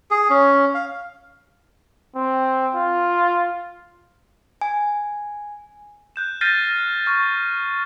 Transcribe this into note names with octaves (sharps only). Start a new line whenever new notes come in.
G#4
C#4
F5
C4
F4
G#5
F#6 G6 E7
F6 G6 A6 A#6 C7 D#7
C#6 F6